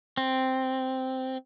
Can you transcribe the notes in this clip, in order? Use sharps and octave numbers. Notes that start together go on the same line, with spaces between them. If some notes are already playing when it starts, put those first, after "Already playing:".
C4